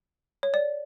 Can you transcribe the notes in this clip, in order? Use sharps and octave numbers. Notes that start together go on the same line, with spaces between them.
C#5
D5